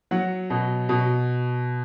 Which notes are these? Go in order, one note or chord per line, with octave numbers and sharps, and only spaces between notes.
F#3 F#5
B2
B2